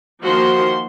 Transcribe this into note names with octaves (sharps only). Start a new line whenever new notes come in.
D#3 F3 A#3 F#4 C5 C6